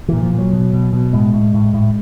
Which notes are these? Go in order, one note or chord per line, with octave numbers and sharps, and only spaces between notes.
A#2 E3
F3
A#2
F#3
B2
B2
B2
A2 G#3
A2
A2
A2